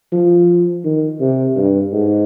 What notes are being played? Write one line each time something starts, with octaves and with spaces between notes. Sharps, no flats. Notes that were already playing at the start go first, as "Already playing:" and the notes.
F3
D#3
C3
G2
G#2